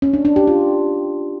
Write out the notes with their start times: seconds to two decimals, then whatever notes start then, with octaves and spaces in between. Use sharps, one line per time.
0.02 C#4
0.14 D4
0.25 D4
0.36 G4
0.47 F4